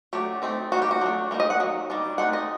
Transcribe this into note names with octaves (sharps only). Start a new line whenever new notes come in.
F#3 A3 D4 G4
A3 C4 D#4
G3 A#3 D#4 F#4
G4
F#4
F#3 A3 D4
G3 A#3 D#4
D#5
F#5
D#3 F#3
D#3 G3 D4
A3 C4 D#4 F#5
D#5